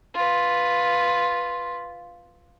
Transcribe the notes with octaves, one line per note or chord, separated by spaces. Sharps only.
F4 B4